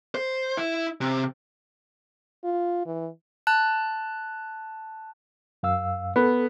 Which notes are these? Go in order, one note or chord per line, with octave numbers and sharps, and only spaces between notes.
C5
E4
C3
F4
E3
A5 F#6
F#2 F5 E6
B3 A4